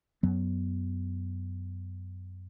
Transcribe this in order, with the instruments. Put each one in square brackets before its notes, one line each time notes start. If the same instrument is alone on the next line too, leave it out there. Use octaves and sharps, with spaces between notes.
[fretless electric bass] F#2 F#3 B3